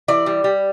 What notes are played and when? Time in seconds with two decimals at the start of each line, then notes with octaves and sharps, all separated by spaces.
0.08 E3 D5
0.26 G3
0.44 G3